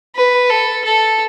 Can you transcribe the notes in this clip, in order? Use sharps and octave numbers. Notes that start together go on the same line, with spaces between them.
B4
A4
A4